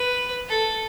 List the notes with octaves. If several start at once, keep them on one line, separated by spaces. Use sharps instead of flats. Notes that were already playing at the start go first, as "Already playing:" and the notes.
Already playing: B4
A4